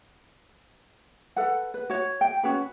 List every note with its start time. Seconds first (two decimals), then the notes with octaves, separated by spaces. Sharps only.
1.36 A4 B4 F#5
1.74 B4
1.90 F#4 C#5
2.21 G5
2.43 C#4 F#4 B4